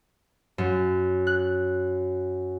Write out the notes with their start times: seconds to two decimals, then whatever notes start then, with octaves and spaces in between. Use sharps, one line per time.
0.58 F#2
1.27 F#6